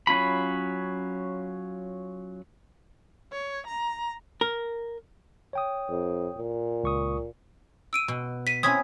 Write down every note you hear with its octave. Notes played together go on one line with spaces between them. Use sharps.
F#3 C#4 F4 B5
C#5
A#5
A#4
C#5 G5 D#6
F2
A#2
C#2 C#6 D#6
E6 D7 D#7
B2
B6 D#7
C4 C#4 E4 D#6 G#6 B6